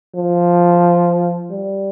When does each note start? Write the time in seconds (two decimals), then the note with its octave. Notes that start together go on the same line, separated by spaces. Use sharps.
0.16 F3
1.50 G3